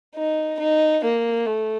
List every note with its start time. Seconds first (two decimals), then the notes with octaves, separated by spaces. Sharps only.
0.16 D#4
0.59 D#4
1.04 A#3
1.46 A3